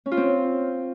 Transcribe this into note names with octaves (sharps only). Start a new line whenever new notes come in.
C#4
F4
C4